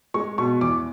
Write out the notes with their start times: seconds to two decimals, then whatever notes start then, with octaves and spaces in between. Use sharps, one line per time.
0.14 G#3 C#6
0.38 B2 C#6
0.61 E2 D6